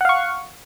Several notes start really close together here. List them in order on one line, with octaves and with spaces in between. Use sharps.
F#5 F5 C#6